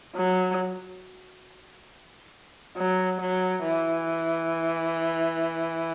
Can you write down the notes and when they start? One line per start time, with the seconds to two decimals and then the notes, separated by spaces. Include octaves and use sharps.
0.15 F#3
2.77 F#3
3.21 F#3
3.64 E3